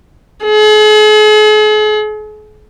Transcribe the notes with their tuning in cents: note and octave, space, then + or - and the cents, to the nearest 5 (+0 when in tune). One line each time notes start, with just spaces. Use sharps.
G#4 +45